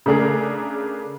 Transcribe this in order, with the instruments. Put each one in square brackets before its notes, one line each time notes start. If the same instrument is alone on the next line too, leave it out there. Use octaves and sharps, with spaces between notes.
[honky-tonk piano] C#3 A3 D4 G#4 A#4